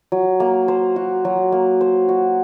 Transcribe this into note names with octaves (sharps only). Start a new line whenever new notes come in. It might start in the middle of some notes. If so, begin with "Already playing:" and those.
F#3
A#3
C5
F#4
F#3
A#3
C5
F#4